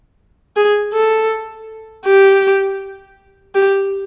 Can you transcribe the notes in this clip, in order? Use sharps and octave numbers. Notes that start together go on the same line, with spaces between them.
G#4
A4
G4
G4